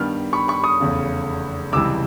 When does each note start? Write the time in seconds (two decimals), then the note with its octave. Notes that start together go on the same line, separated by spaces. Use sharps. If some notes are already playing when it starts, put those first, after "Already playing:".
Already playing: G2 D#3 G3 B3 F6
0.33 B5 C#6
0.48 B5 C#6
0.64 C#6 D#6
0.80 F1 E2 C#3
1.73 C#2 C3 E3 G3 D6 E6